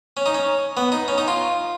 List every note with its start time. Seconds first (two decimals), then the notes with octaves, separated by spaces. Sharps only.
0.17 C#4
0.26 D#4
0.35 C#4
0.77 B3
0.92 D#4
1.08 C#4
1.18 D#4
1.28 F4